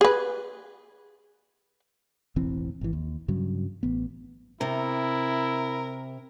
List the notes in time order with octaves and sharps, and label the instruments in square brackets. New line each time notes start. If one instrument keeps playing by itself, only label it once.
[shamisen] G#4 B4
[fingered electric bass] E1 A1 E3 C4
G#1 E3
D#2
G2 C#3 F#3
A1 B3
[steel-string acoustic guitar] C3 [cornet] E4 [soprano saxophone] A#4